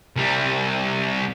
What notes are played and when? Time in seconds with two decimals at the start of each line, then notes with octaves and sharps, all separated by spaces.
0.16 C2 G3